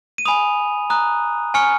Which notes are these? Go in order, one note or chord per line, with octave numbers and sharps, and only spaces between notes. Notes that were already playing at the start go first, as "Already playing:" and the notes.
D#7
G#5 B5 D#6 F7
A#5 D#6 F#6
G#5 C#6 F6 C#7